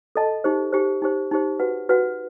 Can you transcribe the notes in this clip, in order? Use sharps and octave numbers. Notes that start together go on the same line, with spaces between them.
A4 D#5 A5
D#4 G4 C5
D#4 G4 C5
D#4 G4 C5
D#4 G4 C5
F#4 B4 F#5
F#4 B4 F#5